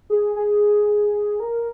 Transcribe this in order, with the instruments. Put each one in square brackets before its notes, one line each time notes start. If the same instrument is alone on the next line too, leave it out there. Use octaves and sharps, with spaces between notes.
[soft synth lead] G#4
G#4
A#4